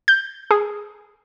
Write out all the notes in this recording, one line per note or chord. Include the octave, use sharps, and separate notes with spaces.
G6
G#4